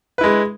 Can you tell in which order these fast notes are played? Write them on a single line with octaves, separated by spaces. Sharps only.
B4 E4 G#3